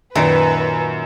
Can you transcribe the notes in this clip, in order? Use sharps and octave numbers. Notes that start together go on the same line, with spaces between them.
F#2 A#2 D#3 B4